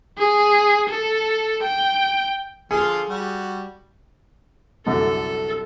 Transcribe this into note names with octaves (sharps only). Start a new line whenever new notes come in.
G#4
A4
G5
D3 F3 F4 G#4
G3 F#4
C2 F#2 D3 A4